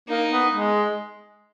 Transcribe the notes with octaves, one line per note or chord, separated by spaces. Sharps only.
A#3 D#4
B3
G#3